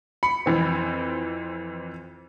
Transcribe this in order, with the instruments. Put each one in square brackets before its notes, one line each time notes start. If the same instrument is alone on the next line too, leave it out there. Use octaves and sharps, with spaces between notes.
[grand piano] B5 [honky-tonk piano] C#7
[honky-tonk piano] F2 E3 C4